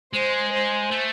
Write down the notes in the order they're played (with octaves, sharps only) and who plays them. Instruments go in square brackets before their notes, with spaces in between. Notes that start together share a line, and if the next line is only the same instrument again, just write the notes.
[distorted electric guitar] G#3 [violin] C5
[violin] C5
[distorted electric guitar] A3